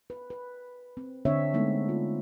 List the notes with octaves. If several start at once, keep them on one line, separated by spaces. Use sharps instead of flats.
B4
B4
C4
D3 C4 D4 C#5 E5
G#3 A3 B3 D#4
F4